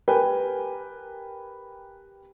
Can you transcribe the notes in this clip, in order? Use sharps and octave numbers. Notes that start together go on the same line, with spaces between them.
G4 A#4 B4 G5 G#5